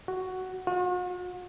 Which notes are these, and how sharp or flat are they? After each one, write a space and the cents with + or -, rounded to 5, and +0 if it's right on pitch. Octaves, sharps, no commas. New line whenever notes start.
F#4 +5
F#4 -45